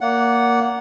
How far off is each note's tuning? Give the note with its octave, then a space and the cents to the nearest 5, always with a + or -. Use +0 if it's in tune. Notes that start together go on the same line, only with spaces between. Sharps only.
A#3 +0 D5 -35 F#5 +0